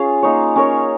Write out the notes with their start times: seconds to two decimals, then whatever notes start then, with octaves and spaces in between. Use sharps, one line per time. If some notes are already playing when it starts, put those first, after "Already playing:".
Already playing: C#4 F4 G#4 F5
0.23 A#3 D#4 C#5
0.56 C#4 A#4 C#5